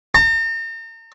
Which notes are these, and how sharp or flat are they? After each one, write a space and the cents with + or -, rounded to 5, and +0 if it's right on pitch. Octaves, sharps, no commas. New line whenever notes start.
A#5 -45